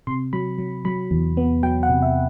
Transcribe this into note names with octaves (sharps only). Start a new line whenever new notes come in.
C3 C6
F#3 B5
F#3
F#3 B5
E2
B3
F#3 G5
F#5
C3
E5